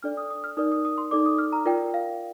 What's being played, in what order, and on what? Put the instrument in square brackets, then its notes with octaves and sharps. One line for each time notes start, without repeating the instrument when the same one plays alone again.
[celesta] D4 A4 D5 F6
D#6
D#6
F6
D#4 A#4 D5 D#6
D#6
D#6
C6
D#4 A4 D5 D6
D#6
F6
A#5
F4 A#4 D5 G5
F5